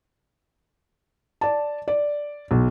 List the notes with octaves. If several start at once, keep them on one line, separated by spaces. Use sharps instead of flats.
D5 A5
D5
B1